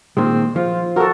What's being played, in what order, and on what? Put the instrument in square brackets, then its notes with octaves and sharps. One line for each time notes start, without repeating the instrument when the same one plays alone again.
[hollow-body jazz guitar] A#2 D#3 G#3 [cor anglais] C4
[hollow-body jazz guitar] F3 [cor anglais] F4
[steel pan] F#4 A4 [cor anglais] A#4